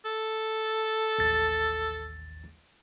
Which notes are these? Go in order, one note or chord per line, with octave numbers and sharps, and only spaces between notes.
A4
A1 D#2 A6